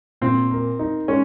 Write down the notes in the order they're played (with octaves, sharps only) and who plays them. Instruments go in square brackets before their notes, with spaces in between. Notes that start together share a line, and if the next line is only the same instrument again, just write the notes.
[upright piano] A#2 [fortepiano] C4
[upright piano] A#4
D#4
[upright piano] G#3 [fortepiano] C#4